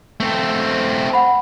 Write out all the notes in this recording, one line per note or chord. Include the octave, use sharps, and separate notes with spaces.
A3 C4
F#5 B5